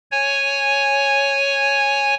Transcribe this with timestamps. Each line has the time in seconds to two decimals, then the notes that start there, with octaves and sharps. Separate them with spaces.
0.11 C#5 G#5